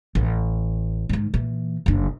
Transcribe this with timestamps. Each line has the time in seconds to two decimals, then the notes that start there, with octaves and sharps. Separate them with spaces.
0.15 A1
1.09 G#2 D#3
1.34 A#2 E3
1.86 F#1 D3